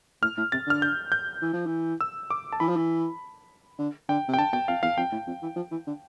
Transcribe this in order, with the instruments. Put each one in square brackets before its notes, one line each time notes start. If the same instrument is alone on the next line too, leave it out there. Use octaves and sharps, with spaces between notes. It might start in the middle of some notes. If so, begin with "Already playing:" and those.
[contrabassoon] A2 [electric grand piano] F6
[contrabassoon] A2
[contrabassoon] C3 [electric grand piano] A6
[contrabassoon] D3 [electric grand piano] F6
[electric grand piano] G6
G6
[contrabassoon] E3
F3
E3
[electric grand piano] E6
D6
A5
[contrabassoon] E3 [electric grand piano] B5
[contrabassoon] F3
E3
D3
[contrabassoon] D3 [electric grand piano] G5
[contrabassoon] C3
[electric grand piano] G5
[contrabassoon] D3 [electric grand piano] A5
[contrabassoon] B2 [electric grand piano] G5
[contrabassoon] F2 [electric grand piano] F5
[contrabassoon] E2 [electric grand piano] F5
[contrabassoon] F2 [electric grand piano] G5
[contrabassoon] A2
F2
E3
F3
E3
D3